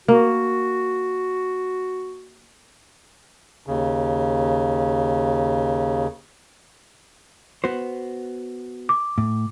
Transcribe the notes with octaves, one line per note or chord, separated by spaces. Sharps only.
A#3 F#4
D#2 C#3
B3 F#4 C5
D6
A2